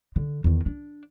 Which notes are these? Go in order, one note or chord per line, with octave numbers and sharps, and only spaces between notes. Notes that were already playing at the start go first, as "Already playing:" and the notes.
D3
E2 D#3
D4